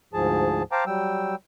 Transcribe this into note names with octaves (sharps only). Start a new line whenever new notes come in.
D2 G#2 F3 G#4 A5
C5 F5 G5 A5 A#5 D6
F#3 G3 G5 E6